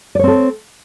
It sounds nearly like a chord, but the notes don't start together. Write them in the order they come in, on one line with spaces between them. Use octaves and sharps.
D5 C#5 C4 A4